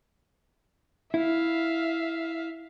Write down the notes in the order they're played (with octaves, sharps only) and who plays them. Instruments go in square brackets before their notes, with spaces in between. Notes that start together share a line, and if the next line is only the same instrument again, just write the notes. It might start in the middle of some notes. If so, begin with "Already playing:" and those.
[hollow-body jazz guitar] E4 [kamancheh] E5 F5